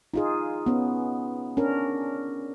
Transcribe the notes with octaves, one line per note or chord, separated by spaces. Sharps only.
D#4 F4 G#4
B3 C#4
C#4 D4 A#4